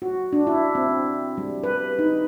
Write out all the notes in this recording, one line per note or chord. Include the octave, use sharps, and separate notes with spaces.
F#4
D4
E4
C4
G3
B4
D#4